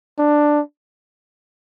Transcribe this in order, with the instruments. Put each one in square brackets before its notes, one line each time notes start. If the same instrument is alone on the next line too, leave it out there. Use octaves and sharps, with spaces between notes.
[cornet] D4